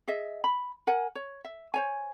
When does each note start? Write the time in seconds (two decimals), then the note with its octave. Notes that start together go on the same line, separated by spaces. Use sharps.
0.08 G#4 D#5 E5
0.44 B5
0.87 A#4 F#5 G#5
1.15 C#5
1.45 E5
1.74 C5 C#5 G#5